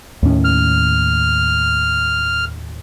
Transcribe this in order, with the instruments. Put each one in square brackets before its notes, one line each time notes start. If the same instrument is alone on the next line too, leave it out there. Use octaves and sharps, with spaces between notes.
[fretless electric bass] D#2 A2 C#4
[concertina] F6